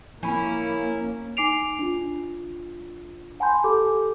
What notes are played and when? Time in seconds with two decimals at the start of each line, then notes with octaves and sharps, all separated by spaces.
0.23 F3 A#3 C#4 E4 B5
1.37 D#4 G#5 D6 C7 D7 F7
1.79 D4 F4
3.40 F#5 G#5 A5 B5 C6 G6
3.64 G4 A4 D6